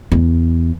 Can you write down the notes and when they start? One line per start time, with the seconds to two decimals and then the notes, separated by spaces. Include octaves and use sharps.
0.12 E2